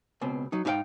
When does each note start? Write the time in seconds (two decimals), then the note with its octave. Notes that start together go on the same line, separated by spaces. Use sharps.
0.21 C#2 B2 C4
0.52 F#3 D#4
0.65 G#2 D#4 F4 C5 F5 G5